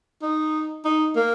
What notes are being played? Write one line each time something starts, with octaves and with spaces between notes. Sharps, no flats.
D#4
D#4
A#3